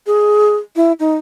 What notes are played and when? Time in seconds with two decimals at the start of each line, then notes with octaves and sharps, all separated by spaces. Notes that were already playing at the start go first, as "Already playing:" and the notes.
0.07 G#4
0.76 E4
1.00 D#4